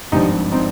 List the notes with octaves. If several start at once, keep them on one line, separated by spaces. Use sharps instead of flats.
G#1 G2 F3 D#4 G4
C4 D#4